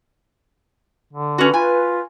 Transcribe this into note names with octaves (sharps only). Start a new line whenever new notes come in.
D3
C#4 F#4 B4
F4 G#5